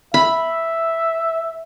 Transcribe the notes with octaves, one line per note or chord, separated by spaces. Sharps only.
E5 B5